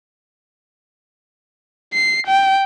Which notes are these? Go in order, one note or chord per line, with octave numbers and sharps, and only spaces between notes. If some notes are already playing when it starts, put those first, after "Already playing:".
C7
G5